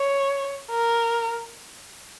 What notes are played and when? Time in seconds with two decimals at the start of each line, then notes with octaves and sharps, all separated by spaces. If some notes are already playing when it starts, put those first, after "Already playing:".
Already playing: C#5
0.71 A#4